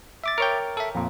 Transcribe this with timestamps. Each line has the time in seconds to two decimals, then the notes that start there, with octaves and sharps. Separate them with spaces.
0.24 E5 D6 A6
0.38 A#4 C#5 G5
0.77 A4 E5
0.95 F2 A#2